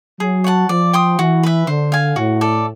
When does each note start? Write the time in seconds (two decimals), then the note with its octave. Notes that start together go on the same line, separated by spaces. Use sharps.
0.20 F#3 G#4
0.44 C#5 F#5 A5
0.69 F3 D5
0.93 G5 C6 D#6
1.19 E3 F#4
1.43 B4 E5
1.67 D3 C5
1.92 F5 G#5
2.16 A2 F#4
2.41 A4 D5